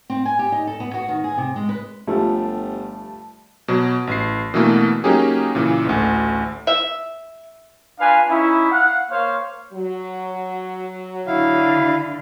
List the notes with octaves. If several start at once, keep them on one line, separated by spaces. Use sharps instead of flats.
C4
G#5
G4
D#4
A4
B3
F#4
D#3
G#4
C3
G#3
B4
G1 F3 G3 A3
B2 F#3
A1 C7
B2 D3 E3 A3 A#3
F#3 A#3 C#4 D#4 G4 G#4
A#2 C#3 E3
A1 D2
E5
D4 F4 B4 F5 G#5
C#4 D#4 E4
F5 F#5
A#3 C5 C#5 F5
F#3
D3 E4 F5